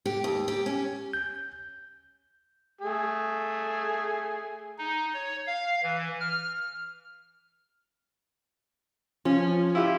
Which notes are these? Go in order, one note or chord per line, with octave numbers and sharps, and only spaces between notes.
G4
D#2
G4
C#4
G6
A3 G#4
D#4
C#5
F5
E3
F6
F3 C#4
E4 F4 G4